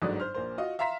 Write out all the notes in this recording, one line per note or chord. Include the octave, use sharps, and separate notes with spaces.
G1 G#2 D3 F#3 D5 D#6
C5 F6
A#1 A#3 C5
F4 F#4 D#5
E5 F5 A#5 C6 B6 E7